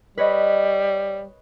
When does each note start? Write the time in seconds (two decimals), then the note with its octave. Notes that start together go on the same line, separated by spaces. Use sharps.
0.18 G3 B4 C#5 D#5